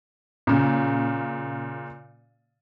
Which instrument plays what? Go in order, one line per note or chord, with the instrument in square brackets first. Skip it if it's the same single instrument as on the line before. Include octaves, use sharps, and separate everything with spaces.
[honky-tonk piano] A#2 C#3